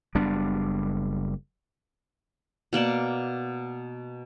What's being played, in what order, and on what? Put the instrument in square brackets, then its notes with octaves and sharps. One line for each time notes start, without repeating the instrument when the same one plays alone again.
[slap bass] F#1 G3 B3 D4
[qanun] B2 A#3 D5 A5